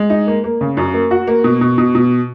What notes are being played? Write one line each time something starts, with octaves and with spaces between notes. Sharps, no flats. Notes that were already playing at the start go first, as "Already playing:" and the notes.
Already playing: G#3
D#4
A#3
A#3
C#3
F#2
A#3
F#4
A#3
B2
B2
B2
B2